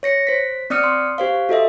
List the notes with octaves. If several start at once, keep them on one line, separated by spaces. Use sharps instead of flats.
C#5 A#6 C#7
C5 B6
C4 D5 D#6 F6 C#7
C6
G4 C5 F5
F#4 A4 D#5 E5